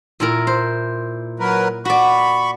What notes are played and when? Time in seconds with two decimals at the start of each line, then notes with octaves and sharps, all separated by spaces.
0.20 A#2 E4 A#4
0.47 C5
1.39 F#3 A#4 B4
1.85 F#4 D5 B5 C#6